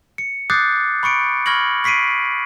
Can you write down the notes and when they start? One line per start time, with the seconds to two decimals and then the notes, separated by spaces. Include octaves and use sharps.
0.18 C#7
0.50 D6 D#6 F#6 G6 A6 C7
1.03 B5 C#6 C#7 D7
1.46 B5 C#6 F6 G#6 A#6 F#7
1.84 C#6 B6 C7 D7 D#7